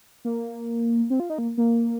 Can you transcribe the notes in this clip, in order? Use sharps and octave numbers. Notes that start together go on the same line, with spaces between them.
A#3
C4
F4
D#4
A#3
A#3